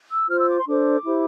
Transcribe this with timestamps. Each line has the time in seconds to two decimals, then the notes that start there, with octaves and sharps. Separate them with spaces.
0.10 E6
0.28 F4 C5 F6
0.39 E6
0.48 D6
0.58 C6
0.66 D4 A4 C5 D6
1.05 E4 G4 C5